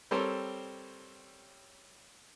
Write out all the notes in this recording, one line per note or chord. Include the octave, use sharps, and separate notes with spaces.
G3 C4 A4 A#4 C5 C#5